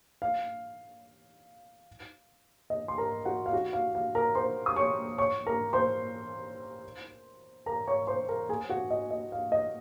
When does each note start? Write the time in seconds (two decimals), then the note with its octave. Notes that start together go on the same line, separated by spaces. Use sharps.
0.22 F5
2.70 D#5
2.88 C6
2.98 A#4 A#5
3.25 F#4 F#5
3.46 F5
3.53 F#4 F#5
3.73 F5
3.95 F5
4.15 A#4 A#5
4.35 C5 C6
4.66 D#6
4.76 C#5 C#6
5.18 C#5 C#6
5.47 A#4 A#5
5.73 C5 C6
7.66 A#4 A#5
7.87 C#5 C#6
8.07 C5 C6
8.29 A#4 A#5
8.49 G#4 G#5
8.70 F#4 F#5
8.91 D#5
9.11 D#5
9.32 F5
9.52 D#5